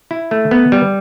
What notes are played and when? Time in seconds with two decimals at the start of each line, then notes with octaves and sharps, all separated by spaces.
0.11 E4
0.31 A3
0.51 B3
0.72 G3